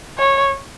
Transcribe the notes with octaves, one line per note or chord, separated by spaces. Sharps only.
C#5